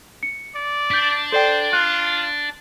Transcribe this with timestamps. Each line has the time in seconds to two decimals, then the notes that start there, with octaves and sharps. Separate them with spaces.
0.23 C#7
0.56 D5
0.91 D4 G6 B6
1.32 A4 C5 D5 G5
1.73 F4 F#6 C7